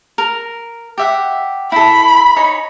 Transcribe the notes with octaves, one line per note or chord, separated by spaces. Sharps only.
A#4
G4 E5 F#5
E4 A4 B5
D#4 C#5 G#5